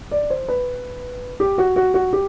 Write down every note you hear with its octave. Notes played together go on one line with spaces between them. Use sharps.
D5
C5
B4
G4
F#4
F#4
F#4
G4